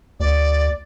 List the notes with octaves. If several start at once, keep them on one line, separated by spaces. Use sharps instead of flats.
D2 D5